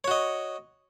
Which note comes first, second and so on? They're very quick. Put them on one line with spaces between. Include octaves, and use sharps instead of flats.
C#5 F#4 D#5